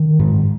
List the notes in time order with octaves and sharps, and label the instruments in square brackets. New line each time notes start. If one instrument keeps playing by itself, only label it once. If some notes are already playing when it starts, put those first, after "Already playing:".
Already playing: [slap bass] D#3
G#2